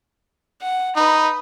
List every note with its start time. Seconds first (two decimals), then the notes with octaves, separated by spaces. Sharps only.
0.62 F#5
0.96 D#4 B4 B5